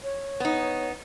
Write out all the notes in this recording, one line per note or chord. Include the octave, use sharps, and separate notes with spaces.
C#5
B3 D#4